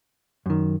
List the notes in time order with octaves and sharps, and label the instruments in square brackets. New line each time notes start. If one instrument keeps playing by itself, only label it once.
[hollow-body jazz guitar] F#2 D#3